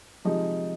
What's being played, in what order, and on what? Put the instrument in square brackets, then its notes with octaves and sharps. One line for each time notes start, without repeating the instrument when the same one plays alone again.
[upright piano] C3 F3 G#3 D#4